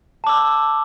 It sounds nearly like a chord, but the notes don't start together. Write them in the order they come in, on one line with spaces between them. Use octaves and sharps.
A5 D6 E6